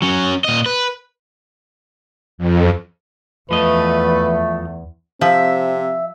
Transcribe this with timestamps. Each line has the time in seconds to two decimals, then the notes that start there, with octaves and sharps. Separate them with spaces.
0.02 F#3 C#4
0.44 A#2 D#5
0.66 B4
2.38 F2
3.51 E2 F3 A3 B4 D#5
5.21 C3 F3 C4 E5